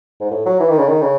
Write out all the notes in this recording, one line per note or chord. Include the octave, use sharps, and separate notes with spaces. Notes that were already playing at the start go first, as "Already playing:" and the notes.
G#2
A2
F#3
E3
D#3
C#3
D#3
C#3